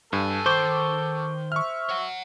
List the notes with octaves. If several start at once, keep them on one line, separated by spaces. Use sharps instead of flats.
E2 G2 A4 G#5
D#3 C5 C#6 D6
E5 C#6 F6
C#5 F#5